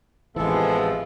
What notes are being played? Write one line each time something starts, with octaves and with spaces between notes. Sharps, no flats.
A1 C3 E3 F3 G#3 B3 A4